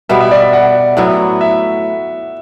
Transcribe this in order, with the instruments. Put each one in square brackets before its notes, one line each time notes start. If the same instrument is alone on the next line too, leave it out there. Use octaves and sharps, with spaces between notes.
[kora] B2 G3 B3 [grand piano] E5
[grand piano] E5
D5
E5
F#5
[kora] A2 F#3 B3 E4
[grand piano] E5